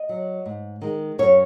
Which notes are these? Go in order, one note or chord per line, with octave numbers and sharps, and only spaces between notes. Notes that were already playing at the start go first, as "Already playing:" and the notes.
Already playing: D#5
F#3
G#2
D#3 G#3
F#2 C#5